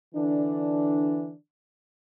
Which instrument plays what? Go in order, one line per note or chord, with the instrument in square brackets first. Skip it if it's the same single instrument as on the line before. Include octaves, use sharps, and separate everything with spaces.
[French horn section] D3 E3 D4